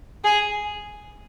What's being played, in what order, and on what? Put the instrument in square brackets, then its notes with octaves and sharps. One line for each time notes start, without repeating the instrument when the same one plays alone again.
[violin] G#4